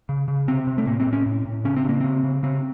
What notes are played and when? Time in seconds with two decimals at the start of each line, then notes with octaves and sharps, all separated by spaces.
0.09 C#3
0.28 C#3
0.48 C3 C4
0.67 C3
0.78 A3
0.87 A2 A#3
1.00 C4
1.06 A2
1.13 C#4
1.26 A2
1.45 A2
1.65 C#3 C#4
1.77 C4
1.85 C#3 A#3
2.01 C#3 C4
2.24 C#3
2.43 C#3 C4